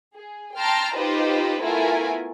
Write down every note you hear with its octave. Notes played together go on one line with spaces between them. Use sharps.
G#4
G5 A5 A#5 C6 F6
D#4 F4 G4 B4 C5 D#5
A3 B3 E4 F4 A#4 G#5